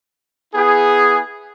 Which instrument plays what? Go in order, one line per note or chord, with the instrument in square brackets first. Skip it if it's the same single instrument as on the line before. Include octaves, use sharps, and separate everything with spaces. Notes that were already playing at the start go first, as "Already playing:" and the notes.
[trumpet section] B3 E4 G#4